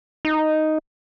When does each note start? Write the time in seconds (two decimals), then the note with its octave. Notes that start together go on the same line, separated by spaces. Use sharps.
0.25 D#4